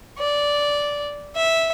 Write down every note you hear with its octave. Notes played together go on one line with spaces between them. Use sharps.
D5
E5